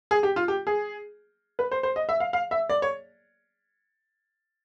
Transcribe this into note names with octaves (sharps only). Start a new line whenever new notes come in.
G#4
G4
F4
G4
G#4
B4
C5
C5
D#5
E5
F5
F5
E5
D5
C#5